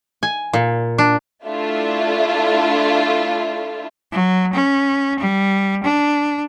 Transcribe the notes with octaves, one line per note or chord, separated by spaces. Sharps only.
G#5
A#2
D4
A3 D4 E4 F4 E5
F#3
C#4
G3
D4